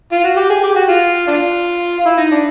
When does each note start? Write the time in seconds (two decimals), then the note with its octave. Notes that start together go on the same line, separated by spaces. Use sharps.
0.12 F4
0.24 F#4
0.36 G4
0.50 G#4
0.63 G4
0.76 F#4
0.88 F4
1.27 D4 F4
2.00 F4
2.05 E4
2.17 D#4
2.31 D4